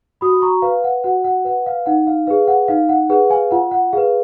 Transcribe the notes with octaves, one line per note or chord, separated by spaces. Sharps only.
F#4 B5 D#6
A#5 C#6
B4 F5
F#5
F#4 F#5
F#5
B4 F#5
F5
D#4 F#5
F5
G#4 B4 F5
F#5
D#4 F5
F#5
G#4 B4 F#5
F5 G#5
F4 F#5
F#5
G#4 B4 F5